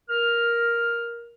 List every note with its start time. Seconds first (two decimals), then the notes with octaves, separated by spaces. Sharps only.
0.10 A#4 F6